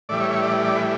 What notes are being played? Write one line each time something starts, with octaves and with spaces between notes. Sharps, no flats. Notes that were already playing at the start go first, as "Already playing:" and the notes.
A2 E3 G3 D5
C#5
C#5
D5
D5
B4